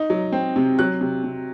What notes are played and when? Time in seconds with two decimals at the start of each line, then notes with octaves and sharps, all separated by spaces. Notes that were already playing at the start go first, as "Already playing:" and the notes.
Already playing: D#4
0.10 F#3
0.32 C4
0.56 C3
0.79 F#3 F#6
1.01 C3
1.24 C3